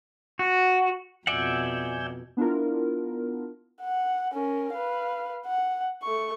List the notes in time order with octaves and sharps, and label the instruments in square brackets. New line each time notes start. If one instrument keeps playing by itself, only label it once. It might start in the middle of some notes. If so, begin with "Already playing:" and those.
[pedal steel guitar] F#4
[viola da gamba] F2 B2 [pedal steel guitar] D5 E5 F#5 [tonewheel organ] G#5 E6 G6
[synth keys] B3 D4 E4 F4 A#4
[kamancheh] F#5
C#4 A#4
B4 F5
F#5
A3 C#6